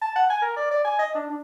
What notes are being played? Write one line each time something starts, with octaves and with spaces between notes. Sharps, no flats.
A5
F#5
G#5
A#4
D5
D5
G#5
D#5
D4
D4